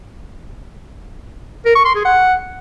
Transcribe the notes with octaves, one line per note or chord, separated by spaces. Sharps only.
A#4
C#6
C6
G#4
F#5